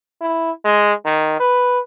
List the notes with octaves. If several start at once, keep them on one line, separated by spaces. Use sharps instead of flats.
E4
G#3
D#3
B4